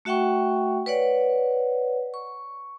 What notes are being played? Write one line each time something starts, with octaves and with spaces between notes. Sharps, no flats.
A3 F#4 E5 F#5 G5 C#6
B4 C#5 D5 F#5
C#6